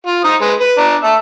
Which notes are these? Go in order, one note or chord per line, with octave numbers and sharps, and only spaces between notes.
F4
D#4 C5 D#6
G#3 B4
B4
D4 A#5
E5 A5